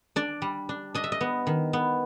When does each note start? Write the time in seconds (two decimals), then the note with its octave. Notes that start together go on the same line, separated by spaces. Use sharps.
0.16 D4 D5
0.42 G3
0.69 D4
0.94 D4 D#5
1.04 E5
1.12 D#5
1.21 B3
1.47 D#3
1.73 B3